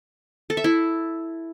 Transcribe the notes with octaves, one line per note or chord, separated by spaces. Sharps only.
A4
E5
E4